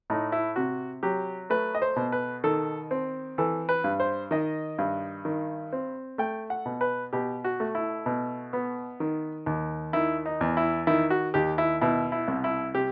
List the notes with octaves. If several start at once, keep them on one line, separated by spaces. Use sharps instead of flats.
A2 D#4
E4
C3 F#4
F#3 G4
A3 B4
D#5
C5
B2
B4
D#3 A4
C4
E3 A4
B4
G2
C5
D#3 D#5
G2
D#3
C4
A3 G5
F#5
B2
B4
B2 G4
F#4
A3
E4
B2
B3
D#3
D#2
D#3 E4
D#4
E2
E4
D#3 E4
F#4
D#2 G4
E4
B2 E4
E4
C2
E4
C3 G4